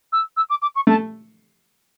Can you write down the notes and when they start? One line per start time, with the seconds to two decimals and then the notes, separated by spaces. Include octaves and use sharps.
0.12 E6
0.36 E6
0.50 D6
0.62 D6
0.75 C#6
0.87 A3 A5